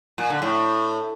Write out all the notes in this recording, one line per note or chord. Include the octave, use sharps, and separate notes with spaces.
A#2
D3
A2